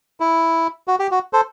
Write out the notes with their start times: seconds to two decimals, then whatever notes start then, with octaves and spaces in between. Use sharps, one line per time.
0.20 E4
0.88 F#4
0.99 G4
1.11 F#4
1.33 A4 C5